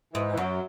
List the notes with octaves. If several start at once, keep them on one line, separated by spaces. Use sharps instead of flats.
G#2 E3
E3
F#2 F#3